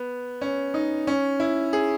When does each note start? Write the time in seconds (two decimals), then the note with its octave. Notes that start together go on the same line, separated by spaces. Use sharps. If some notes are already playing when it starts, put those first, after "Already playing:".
Already playing: B3
0.41 C#4
0.74 D#4
1.07 C#4
1.40 E4
1.73 G#4